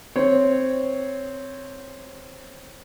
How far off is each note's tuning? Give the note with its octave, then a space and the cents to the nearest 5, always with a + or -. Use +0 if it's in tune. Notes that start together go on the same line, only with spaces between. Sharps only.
C4 +0 C#5 +0